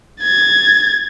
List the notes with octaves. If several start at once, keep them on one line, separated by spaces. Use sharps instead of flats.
G#6 A6